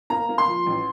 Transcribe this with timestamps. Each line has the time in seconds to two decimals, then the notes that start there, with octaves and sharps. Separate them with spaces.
0.10 A#3 A#5
0.29 A#3
0.38 C6
0.48 F3
0.66 A1